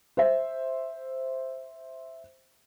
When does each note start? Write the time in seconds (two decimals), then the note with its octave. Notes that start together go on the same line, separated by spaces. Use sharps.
0.17 C5 E5